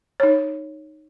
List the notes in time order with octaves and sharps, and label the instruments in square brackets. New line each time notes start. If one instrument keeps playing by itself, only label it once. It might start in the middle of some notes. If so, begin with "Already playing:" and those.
[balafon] D#4 C#5